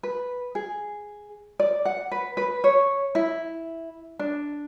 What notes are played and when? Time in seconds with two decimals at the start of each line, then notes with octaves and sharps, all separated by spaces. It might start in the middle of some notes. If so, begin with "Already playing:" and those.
0.03 B4
0.55 G#4
1.60 D5
1.85 F#5
2.12 B4
2.37 B4
2.64 C#5
3.15 E4
4.19 D4